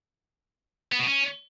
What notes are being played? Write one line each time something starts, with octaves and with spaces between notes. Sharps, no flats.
B3
B2
C#4